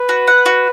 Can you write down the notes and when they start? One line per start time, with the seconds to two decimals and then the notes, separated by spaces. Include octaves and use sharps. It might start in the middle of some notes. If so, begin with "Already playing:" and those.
Already playing: B4
0.09 F#4
0.27 F#5
0.46 F#4